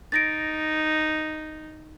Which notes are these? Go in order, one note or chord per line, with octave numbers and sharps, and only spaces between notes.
D#4 A6 A#6 D7